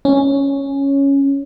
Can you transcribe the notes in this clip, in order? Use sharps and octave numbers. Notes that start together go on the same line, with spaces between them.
C#4